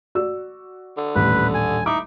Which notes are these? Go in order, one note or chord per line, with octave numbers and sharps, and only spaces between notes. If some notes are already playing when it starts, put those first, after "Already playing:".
F#4 D5 E6
D3
D#1 A1 A4 B4
G#5
D#4 E4 D6